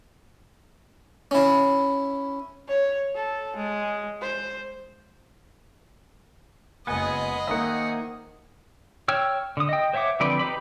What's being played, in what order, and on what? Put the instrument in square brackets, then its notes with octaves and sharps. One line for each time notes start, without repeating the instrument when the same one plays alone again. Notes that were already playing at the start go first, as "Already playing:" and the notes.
[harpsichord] C#4 E4
[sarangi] C#5
A4
G#3
C5
[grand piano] F#1 F#6 [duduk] G#3 [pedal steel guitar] B3 G#5 [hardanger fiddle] G#4 D#5
[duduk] D#3 [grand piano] A#3 D#4 C5 [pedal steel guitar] E5 F#5
[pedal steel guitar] C#5 G5 E6 F6
D3 D#6
D#5 G5
C5 C#5 E5 F#5 D6
D3 F3 C4 B4 D5
D#4 G4 B4 D5 B5